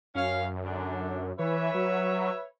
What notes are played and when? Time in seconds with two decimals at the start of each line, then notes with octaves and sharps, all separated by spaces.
0.15 F#2 C#4 F5
0.64 D3 D4
1.39 E3 B4 C#5 E5
1.75 F#3